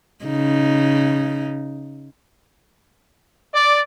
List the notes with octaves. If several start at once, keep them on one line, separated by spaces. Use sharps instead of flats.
C#3 D#4
D5